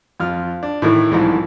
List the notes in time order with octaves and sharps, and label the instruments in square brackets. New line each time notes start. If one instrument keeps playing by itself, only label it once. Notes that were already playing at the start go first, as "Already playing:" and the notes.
[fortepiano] F2 F4 F6
D4
A2 D#3 E3 A3
C2 G#2 E3 F3